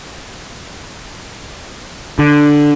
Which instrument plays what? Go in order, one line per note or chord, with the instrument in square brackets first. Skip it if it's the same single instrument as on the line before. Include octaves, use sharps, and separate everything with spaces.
[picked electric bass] D3